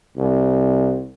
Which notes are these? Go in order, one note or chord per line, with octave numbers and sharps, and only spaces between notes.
C2